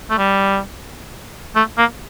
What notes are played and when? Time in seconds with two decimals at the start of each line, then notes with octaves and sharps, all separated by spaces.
0.10 A3
0.18 G3
1.55 A3
1.78 A#3